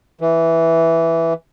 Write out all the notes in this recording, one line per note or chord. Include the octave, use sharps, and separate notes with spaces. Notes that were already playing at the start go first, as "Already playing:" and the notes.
E3